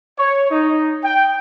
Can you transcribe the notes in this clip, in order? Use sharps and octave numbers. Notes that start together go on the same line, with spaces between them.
C#5
D#4
G5